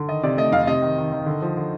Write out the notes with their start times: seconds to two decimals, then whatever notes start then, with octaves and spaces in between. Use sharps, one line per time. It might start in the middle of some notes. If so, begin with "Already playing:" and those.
Already playing: D3
0.08 D#3 D#5
0.23 C3 D5
0.37 A3 D#5
0.52 F2 F5
0.67 C3 D#5
0.82 D#3
0.98 D#3
1.12 D#3
1.26 D3
1.42 F3
1.57 D3